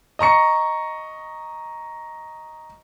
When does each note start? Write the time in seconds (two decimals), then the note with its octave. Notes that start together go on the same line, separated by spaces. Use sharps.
0.19 D#5 A#5 C#6 C#7